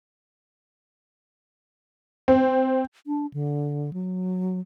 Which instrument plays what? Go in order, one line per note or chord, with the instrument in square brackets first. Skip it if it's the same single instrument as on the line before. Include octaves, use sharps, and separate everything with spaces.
[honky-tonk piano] C4
[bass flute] D4
D3
F#3